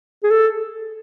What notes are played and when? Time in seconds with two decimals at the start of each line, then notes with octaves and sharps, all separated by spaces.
0.23 G#4
0.31 A4